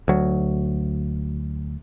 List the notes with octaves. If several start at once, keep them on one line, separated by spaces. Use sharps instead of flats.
D2 F#3